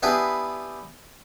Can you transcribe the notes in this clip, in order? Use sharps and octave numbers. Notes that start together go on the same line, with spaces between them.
B3 D4 E4 G4 G#4 B4